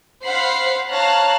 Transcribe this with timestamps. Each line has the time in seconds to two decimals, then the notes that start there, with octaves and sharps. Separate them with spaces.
0.24 C5 F5 F#5 B5 C7
0.91 C#5 F5 A5 A#5 F#6 A6